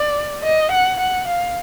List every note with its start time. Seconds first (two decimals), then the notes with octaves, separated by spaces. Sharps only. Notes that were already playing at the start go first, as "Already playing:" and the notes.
Already playing: D5
0.43 D#5
0.71 F#5
0.99 F#5
1.27 F5